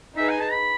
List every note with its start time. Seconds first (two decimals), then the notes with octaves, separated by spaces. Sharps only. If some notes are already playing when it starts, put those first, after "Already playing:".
0.16 D#4 G#4 B4 E5
0.29 G#5
0.40 A5
0.52 B5